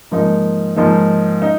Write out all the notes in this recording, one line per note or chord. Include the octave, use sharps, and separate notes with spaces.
G#2 F3 A#3 D#4
G#2 F3 A#3 D#4
D#4